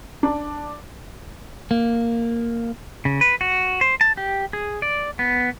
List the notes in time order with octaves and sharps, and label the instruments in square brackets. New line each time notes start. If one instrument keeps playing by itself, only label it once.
[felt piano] D4
[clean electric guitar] A#3
[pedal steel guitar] C#3
B4
F#4
C5
A5
G4
G#4
D5
B3